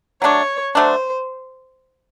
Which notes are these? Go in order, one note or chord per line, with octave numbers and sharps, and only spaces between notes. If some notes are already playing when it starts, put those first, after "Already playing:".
F#3 A3 D4 C#5
F#3 A3 D4 C5